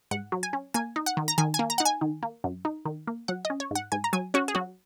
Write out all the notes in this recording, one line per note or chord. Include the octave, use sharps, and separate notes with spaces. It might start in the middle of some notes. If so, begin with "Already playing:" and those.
G#2 F#5
F#3
G#5
C#4
A#3 G#5
D#4
F#5
D#3
A#5
D#3 G#5
G#5
A#3
A#5
D#4 F#5
G#5
D#3
A#3
F#2
D#4
D#3
A#3
F#3 F#5
D#5
C#4
C#5
G#2 F#5
G#2 G#5
A#5
F#3 G#5
C#4 F#4
G#4
F#3 F#4